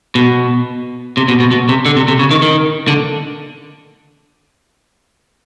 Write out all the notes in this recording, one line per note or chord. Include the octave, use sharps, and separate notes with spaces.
B2
C3
B2
B2
B2
C3
D3
C3
C3
C#3
D#3
D#3
D3